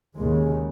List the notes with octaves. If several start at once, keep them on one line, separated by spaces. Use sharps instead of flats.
D#2 C#3 G#3